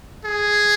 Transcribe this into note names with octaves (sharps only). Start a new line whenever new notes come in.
G#4